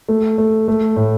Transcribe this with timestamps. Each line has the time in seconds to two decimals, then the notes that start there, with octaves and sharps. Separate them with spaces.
0.09 A3
0.38 A3
0.68 A3
0.96 A2